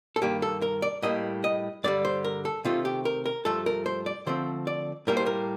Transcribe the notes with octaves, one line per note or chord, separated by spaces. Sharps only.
A4
G2 D#3 A#3 G4
A4
A#4
D5
A2 G3 A#3 D#5
D#5
G2 D3 G3 D5
C5
A#4
A4
C3 D#3 A3 C4 F4
G4
A#4
A#4
G2 F3 A3 A4
A#4
C5
D5
D3 F3 A3 C4 C5
D5
A2 G3 A#3 A#4
C5
A#4